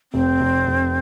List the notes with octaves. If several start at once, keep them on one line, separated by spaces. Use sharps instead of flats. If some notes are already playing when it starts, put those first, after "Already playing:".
F1 C4
F1
F1